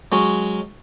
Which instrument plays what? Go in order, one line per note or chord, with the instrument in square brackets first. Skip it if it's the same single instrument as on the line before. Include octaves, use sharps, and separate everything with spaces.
[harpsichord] F#3 G#3 C#4